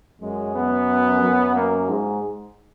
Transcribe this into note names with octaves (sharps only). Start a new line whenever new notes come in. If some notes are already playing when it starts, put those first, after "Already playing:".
F#2 G#3
B3
F#2
A#3
G#2 G#3